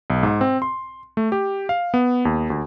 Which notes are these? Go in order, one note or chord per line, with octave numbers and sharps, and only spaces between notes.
B1
G#2
C4
C6
A3
G4
F5
B3
D#2
D2